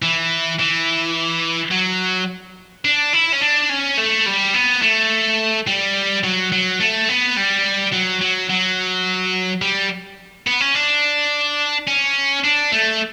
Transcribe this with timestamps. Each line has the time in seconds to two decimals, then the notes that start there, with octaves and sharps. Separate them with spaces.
0.02 E3
0.59 E3
1.72 F#3
2.85 D4
3.13 E4
3.33 C#4
3.41 D4
3.70 C#4
3.98 A3
4.26 G3
4.54 B3
4.82 A3
5.67 G3
6.24 F#3
6.52 F#3
6.80 A3
7.09 B3
7.36 G3
7.93 F#3
8.21 F#3
8.50 F#3
9.62 G3
10.47 B3
10.61 C#4
10.75 D4
11.88 C#4
12.44 D4
12.72 A3